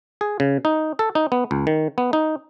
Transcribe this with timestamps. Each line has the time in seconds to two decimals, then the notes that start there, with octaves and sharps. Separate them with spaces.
0.21 G#4
0.40 C#3
0.65 D#4
0.99 A4
1.15 D#4
1.32 B3
1.51 C#2
1.67 D#3
1.98 B3
2.13 D#4